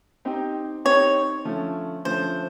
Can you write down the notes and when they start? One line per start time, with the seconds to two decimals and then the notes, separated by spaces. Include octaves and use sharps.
0.25 C4 D#4 G4
0.85 C4 D#4 G4 C#5
1.45 D3 F3 A3 C#4
2.05 D3 F3 A3 C#4 C5